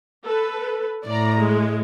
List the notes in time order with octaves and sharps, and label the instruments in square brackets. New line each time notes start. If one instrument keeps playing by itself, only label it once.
[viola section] A4 B4
[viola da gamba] A2 [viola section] D5 A#5
[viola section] G#3